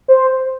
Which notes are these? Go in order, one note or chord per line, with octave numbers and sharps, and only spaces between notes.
C5